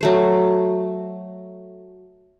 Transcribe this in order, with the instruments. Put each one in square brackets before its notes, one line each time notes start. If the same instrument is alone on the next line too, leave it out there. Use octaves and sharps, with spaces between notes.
[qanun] F#3 A3 C5